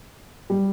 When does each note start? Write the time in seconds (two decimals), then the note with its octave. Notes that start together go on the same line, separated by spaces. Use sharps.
0.50 G3